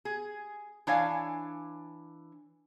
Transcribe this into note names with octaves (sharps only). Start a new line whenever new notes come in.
G#4
E3 D4 C#5 F5 G#5